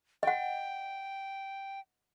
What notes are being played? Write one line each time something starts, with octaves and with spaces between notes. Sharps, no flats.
D#5 F#5 G5